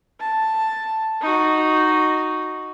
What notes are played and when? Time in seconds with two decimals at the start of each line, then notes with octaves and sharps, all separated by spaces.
0.20 A5
1.21 D#4 F#4